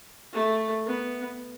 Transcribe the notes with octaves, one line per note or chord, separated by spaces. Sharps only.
A3
B3